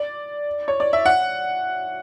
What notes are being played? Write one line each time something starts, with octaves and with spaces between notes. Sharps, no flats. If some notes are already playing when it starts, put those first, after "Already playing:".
Already playing: D5
C#5
D5
E5
F#5